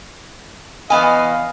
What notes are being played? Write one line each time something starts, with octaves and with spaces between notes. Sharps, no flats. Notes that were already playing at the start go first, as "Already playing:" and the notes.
E2 B3 D#5 F5 G#5